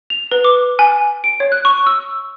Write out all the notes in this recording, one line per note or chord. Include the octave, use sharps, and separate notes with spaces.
F7
B4
D6
G#5
D7
C#5
F#6
C#6
E6